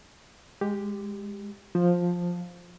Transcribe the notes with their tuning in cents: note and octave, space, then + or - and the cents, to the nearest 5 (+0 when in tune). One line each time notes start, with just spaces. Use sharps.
G#3 -10 G4 +5
F3 +10 C5 +0